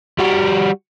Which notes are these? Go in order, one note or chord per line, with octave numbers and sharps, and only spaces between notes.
G3 F#4